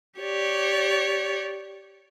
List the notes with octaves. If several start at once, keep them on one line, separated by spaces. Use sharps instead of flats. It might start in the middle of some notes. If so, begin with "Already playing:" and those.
G4 C#5 D5